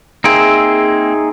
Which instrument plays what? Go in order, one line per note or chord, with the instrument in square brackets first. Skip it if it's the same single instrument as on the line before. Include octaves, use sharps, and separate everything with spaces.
[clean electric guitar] A#3 C4 [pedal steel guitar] D#4 G#4 E5